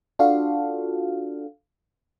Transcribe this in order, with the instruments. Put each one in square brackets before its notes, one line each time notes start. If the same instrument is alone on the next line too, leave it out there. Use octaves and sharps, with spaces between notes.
[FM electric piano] D4 F4 F#4 A4 F5